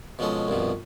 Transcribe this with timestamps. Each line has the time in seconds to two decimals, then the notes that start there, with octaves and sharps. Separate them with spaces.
0.19 B2 F3 G#3 C#4 A4
0.48 C2 G2 B2 F3